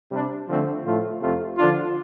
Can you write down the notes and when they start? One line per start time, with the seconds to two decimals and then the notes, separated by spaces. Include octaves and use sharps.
0.11 C3 G3 D4
0.48 D3 F3 A3 C4
0.84 A2 F3 A3 F4
1.20 F2 C3 A3 F4
1.56 D3 F3 D4 F4